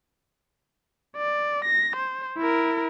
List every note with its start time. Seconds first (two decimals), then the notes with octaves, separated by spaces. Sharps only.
1.17 D5
1.64 A#6
1.96 C5
2.37 E4 A#4